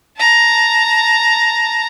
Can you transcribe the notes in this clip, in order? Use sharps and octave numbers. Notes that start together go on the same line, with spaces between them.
A5 A#5